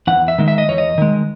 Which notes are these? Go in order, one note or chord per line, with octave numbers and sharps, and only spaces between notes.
E2 F#5
E5
D#3 G#3
E5
D#5
E2 C#5
D#5
D#3 G#3